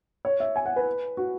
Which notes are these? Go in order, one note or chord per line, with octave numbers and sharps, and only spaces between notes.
C#5
E5
G#5
F#5
B4
F#4